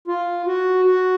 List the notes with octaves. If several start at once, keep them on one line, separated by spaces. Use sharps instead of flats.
F4
F#4
F#4